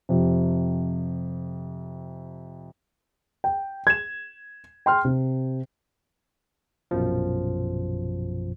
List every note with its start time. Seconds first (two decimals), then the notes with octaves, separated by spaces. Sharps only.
0.09 F2 C3
3.44 G5
3.87 G#6 E7
4.86 G5 C6 F6
5.05 C3
6.91 A#1 F#2 B2 F3